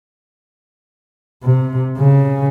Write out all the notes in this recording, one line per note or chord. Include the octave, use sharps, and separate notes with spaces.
C3
C#3